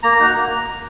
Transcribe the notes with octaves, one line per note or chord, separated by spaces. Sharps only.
A#3 A#5
D#4 F#4
A#3